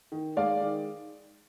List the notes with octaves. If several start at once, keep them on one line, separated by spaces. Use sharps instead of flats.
D#3
G#3 D5 F5
D#3